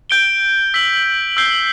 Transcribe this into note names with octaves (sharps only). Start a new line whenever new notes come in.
G6 D7 G7
E6 B6 F#7
E6 G6 C7 G7